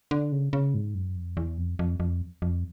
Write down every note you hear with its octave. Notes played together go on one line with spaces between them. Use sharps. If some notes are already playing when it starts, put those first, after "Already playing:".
D3
C#3
C#3
G#2
F#2
F2
E2
F2
F2
F2
F2